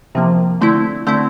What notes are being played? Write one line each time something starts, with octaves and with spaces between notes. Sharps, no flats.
C2 C3 F3 A#3
D3 A3 C4 E4
D3 A3 C4 E4